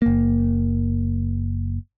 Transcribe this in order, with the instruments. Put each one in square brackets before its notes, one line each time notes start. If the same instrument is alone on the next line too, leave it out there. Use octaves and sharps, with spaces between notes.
[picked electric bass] F#1 A#3